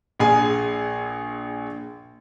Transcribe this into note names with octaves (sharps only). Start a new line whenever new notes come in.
A#1 G#4 G#5